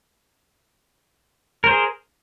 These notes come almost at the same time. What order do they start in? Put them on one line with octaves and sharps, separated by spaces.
A#4 C5 G#4